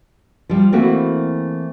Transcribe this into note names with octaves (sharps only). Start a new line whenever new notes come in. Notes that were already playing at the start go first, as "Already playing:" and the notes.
F3 G3
E3 A3 A#3 C4 E4 F#4